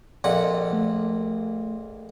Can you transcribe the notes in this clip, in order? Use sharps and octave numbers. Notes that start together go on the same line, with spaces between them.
A#1 F2 D5 D#5 F#5
A3